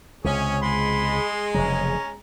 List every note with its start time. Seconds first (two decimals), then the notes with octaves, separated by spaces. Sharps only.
0.24 C#2 C3 C#4 G#4 C#5
0.62 G#3 B5 C6
1.54 F1 C#3 F#3 C#4 A#5